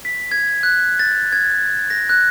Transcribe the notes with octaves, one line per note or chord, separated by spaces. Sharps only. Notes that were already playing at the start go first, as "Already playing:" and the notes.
B6
G#6
F#6
A6
G#6
A#6
F#6